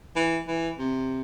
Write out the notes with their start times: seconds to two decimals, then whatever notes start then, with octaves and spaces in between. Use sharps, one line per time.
0.16 E3
0.48 E3
0.79 C3